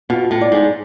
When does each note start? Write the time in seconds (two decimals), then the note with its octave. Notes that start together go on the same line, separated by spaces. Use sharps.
0.10 B2 F4
0.31 A2
0.41 D5
0.52 G#2